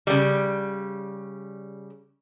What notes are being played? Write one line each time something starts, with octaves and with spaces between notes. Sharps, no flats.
C#3 G3